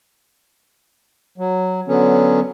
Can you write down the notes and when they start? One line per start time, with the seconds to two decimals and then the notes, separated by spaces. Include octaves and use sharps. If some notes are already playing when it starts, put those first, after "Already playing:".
1.38 F#3
1.88 D3 F#3 B3 C#4